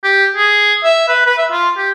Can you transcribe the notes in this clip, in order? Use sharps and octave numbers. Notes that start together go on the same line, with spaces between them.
G4
G#4
E5
B4
B4
E5
F4
G4